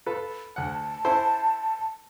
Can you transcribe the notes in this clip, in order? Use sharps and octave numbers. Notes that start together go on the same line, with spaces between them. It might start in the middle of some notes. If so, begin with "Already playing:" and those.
F4 A4 B4
D2 F#5 A5
C#4 E4 C5